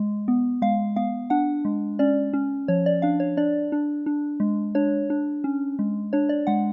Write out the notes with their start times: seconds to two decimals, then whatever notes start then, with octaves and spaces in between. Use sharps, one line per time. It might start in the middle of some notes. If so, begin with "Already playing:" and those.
Already playing: G#3
0.28 B3
0.62 G#3 F5
0.96 B3 F5
1.30 D4 F#5
1.65 G#3
1.99 C#4 D5
2.34 C#4
2.68 F3 C#5
2.86 D5
3.02 D4 F5
3.20 C#5
3.37 D4 D5
3.72 D4
4.06 D4
4.40 G#3
4.75 D4 C#5
5.10 D4
5.44 C#4
5.79 G#3
6.13 D4 C#5
6.29 D5
6.47 G#3 F#5